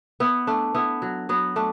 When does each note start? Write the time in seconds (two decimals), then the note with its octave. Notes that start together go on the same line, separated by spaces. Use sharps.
0.20 B3 E4
0.47 A3 D4
0.75 B3 E4
1.02 F#3
1.29 F#3 B3
1.56 A3 D4